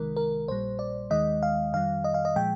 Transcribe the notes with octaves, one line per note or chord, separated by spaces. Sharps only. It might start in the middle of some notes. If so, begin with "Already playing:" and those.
Already playing: C2 C3 D#3 G#3 A#4
A#4
A#1 A#2 G3 C5
D5
D#2 D#3 G#3 D#5
F5
F2 D#3 G3 F5
D#5
F5
D#5
A#2 F3 G#3 G5